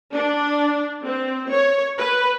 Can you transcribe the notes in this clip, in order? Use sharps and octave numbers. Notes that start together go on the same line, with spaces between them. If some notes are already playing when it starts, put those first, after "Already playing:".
D4
C4
C#5
B4